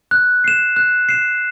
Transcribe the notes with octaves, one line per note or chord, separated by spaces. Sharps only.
F#6
C7 E7
F#6
C7 E7